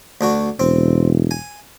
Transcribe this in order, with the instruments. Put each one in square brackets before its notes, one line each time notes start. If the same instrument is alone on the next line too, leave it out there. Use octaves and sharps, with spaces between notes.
[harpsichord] D2 D4 F#4
[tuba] E1 [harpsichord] C4
[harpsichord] G#5